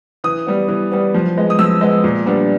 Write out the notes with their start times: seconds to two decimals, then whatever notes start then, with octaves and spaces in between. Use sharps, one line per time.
0.24 E3 D#6
0.47 G3 B3
0.68 E3
0.92 G3 B3
1.14 F3
1.37 G#3 B3
1.50 D#6
1.59 F3 E6
1.81 G#3 B3
2.04 A#2
2.26 G3 B3 D4